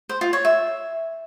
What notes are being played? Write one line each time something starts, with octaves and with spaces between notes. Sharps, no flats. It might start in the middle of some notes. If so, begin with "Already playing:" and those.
C5
F4
C#5
E5